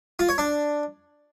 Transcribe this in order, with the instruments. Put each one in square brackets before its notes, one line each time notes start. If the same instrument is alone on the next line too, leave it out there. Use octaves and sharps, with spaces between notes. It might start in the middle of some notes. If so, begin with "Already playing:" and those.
[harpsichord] F4
C#5
D4